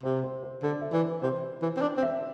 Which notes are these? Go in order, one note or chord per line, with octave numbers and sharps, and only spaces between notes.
C3 C5
C5
C5
D3 D5
E5
E3 D5
C3 C5
E3
C4
D4 D5
C4
E5